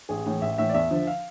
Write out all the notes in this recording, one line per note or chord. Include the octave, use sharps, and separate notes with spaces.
A1 G#4
A2 E3
A1 E5
A2 E3 E5
D5
E2 E5
D3 F3
F5